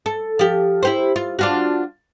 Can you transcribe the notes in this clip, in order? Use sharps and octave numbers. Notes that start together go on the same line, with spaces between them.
A4
F3 G4
E4 G4 C5
F4
D4 F4 F#4